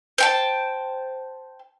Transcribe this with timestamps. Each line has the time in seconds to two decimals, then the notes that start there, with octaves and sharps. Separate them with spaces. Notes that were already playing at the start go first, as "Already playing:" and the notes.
0.18 C5 G5 A5